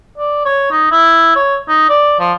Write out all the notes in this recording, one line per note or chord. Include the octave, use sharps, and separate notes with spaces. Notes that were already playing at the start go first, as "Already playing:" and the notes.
D5
C#5
D#4
E4
C#5
D#4
D5
F3